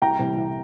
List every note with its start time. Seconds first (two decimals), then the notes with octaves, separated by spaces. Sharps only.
0.02 C2 G5 A#5
0.19 C3 E3 G3
0.37 C2